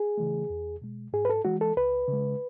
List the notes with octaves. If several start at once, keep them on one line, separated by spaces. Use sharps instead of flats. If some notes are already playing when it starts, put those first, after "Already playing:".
Already playing: G#4
C#3 E3 A3
E2
B2 G#3
G#2 G#4
B4
A4
E3 G#3 F#4
A4
C#2 B4
C#3 G#3